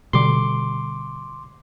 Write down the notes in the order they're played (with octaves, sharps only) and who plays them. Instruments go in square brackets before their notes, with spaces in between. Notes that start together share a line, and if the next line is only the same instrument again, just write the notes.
[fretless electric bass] B2 D3 G3 [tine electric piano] C6 D6